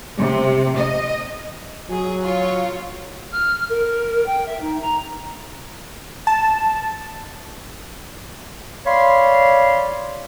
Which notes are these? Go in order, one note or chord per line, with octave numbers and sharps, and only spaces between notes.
C3
D#5
F#3 G#4
F4 C#5
F6
A#4
G5
E5
D#4
A#5
A5
C#5 D5 F5 B5 C6